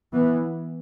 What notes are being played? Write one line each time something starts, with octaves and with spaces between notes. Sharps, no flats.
E3 B3